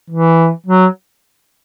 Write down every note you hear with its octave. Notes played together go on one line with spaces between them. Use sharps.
E3
F#3